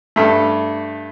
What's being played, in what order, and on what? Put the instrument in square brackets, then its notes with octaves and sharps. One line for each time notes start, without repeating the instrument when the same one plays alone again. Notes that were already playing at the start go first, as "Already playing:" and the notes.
[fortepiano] G2 A3